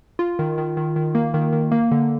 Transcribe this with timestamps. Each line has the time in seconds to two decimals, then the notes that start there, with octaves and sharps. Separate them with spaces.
0.19 F4
0.39 D#3
0.58 D#3
0.77 D#3
0.96 D#3
1.15 A#3
1.34 D#3
1.53 D#3
1.72 A#3
1.91 D3